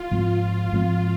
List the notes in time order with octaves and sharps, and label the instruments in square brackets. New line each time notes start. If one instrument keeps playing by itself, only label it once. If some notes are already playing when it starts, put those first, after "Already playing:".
Already playing: [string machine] F4
[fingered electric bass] G#2 F3 G#3 C4
G#2 F3 G#3 C4